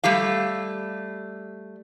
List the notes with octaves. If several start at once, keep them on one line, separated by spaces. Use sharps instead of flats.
G3 A3 G4 F5